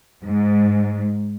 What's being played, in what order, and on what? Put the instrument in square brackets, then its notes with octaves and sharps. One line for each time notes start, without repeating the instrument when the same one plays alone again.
[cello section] G#2